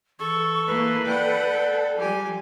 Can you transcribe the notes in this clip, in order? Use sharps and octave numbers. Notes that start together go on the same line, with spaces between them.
E3 A4 C#6
A#3 E4 B4
A4 D5 F#5 G5
F3 G3 G4 G#5